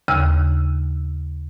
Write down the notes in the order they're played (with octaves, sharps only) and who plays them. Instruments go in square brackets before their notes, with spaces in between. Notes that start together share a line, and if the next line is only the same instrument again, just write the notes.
[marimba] D#2 C#3 E6